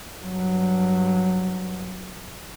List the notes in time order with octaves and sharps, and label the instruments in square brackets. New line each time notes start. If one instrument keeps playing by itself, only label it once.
[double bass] G2 F#3